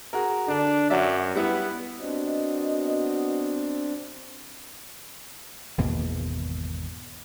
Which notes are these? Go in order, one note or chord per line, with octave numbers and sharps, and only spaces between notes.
F#4 G#4 A#4
D3 D4
F#2 F#3 D5 E5
G3 B3 E4
B3 C4 D4 F#4 D#5
G#1 E2 B2 A#3